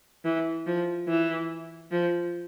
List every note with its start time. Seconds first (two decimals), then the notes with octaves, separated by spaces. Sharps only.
0.24 E3
0.66 F3
1.08 E3
1.91 F3